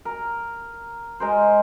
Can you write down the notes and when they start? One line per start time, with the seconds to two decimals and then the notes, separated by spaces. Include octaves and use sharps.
0.05 A#4
1.20 G#3 A#4 C5